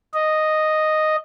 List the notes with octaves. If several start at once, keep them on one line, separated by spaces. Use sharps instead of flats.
D#5